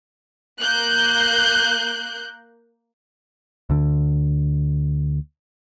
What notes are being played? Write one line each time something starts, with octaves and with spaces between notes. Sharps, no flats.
A#3 F#6 G6
D2 D3